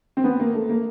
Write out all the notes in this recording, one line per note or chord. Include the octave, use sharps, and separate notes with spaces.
C4
B3
A#3
A3
A#3